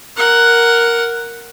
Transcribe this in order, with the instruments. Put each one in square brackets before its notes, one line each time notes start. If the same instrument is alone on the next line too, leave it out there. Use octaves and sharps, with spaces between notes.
[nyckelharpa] A#4 F#5